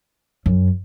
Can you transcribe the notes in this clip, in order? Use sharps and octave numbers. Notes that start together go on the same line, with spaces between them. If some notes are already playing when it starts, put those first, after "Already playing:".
F#2